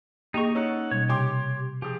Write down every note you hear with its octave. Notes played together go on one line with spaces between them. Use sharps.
A#3 D#4 G4 G#4 D#5 A#5 C#6
C#4 D#4 A4 F#5
B2 G3 C#5
C3 G4 C#5 G5 C6 D6
F3 G4 G#4